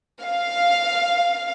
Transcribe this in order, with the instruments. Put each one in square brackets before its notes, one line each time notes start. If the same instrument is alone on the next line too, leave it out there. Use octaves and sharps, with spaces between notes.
[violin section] F5